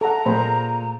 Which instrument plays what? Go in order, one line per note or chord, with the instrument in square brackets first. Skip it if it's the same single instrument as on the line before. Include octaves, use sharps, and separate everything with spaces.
[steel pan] A4 F#5 [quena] A#5
[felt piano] A#2 [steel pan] G#4 C5 B5